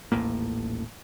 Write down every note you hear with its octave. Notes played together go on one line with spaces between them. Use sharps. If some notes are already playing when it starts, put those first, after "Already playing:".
D#1 A1 A2 A#3